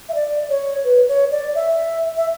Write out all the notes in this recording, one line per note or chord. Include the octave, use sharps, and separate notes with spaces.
E5
D5
C#5
B4
C#5
D5
E5
E5